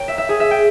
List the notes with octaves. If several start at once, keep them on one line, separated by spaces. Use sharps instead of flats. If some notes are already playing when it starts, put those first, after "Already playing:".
Already playing: A#4 C#5 G5
E5
E5
G#4
E5
G5